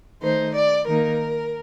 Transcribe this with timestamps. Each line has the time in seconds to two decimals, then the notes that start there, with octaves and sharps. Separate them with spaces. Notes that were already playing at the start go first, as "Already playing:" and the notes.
0.21 D#3 A3 D#4 C5
0.54 D5
0.86 D#3 A#3 D#4 A#4